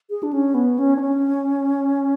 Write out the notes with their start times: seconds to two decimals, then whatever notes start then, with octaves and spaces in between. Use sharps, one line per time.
0.10 G#4
0.23 D4
0.33 C#4
0.54 B3
0.78 C#4
0.96 D4
1.01 C#4